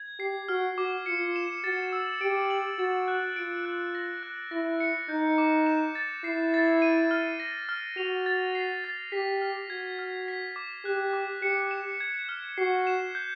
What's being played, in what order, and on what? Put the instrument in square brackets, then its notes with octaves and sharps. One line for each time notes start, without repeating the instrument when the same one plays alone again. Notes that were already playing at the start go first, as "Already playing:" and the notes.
Already playing: [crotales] G#6
[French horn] G4 [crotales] C7
[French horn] F#4 [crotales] F6
[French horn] F#4 [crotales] D6
[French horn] F4 [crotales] C#7
[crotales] E7
[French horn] F#4 [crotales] A6
[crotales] E6
[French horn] G4 [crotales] D7
[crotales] F#7
[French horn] F#4 [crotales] A6
[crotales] F#6
[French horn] F4 [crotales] D7
[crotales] F#6
A#6
F#6
[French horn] E4 [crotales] A#6
[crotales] C#7
[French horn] D#4 [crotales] G6
[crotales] D6
E7
A6
[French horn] E4 [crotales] C7
[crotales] A6
D#7
F6
A#6
F6
[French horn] F#4 [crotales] F7
[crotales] A6
C7
A6
[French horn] G4 [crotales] B6
[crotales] F6
[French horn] F#4 [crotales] G#6
[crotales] F6
B6
D6
[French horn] G4 [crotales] F#6
[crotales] D6
[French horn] G4 [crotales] C#7
[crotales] E7
G#6
F6
[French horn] F#4 [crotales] C7
[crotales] E7
G6